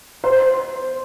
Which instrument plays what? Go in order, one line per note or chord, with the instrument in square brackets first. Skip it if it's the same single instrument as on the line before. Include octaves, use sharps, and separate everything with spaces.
[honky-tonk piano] C5